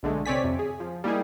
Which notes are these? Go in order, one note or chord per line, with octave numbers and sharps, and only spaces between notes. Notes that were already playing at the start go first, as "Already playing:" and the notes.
B1 D3 G#3 A3
C3 C4 C#5 D5 G#5 B6
F2 C3
G#4
F3
G3 A#3 D#4 E4 G#4